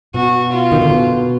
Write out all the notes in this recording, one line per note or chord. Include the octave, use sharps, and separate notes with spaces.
B2 F#4
F4
D#3
D3
B2